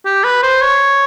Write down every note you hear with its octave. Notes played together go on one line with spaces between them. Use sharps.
G4
B4
C5
C#5